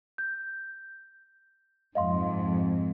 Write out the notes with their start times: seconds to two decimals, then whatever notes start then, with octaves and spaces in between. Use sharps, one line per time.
0.18 G6
1.95 F2 G#2 D#5 F5 C6